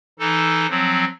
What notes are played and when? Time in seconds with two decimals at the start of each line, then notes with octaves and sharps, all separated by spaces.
0.19 E3 D#4 A4
0.69 F3 F#3 C4